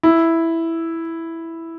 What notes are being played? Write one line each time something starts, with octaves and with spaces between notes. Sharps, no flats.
E4